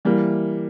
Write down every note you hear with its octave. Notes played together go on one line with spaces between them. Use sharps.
E3 G3 A#3